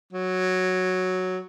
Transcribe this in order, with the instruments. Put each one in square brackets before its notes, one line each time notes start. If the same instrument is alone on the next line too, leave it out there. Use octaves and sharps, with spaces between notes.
[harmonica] F#3